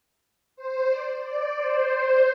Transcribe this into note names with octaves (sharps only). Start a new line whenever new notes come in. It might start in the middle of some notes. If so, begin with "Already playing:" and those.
C5
D5
D5
C5
C5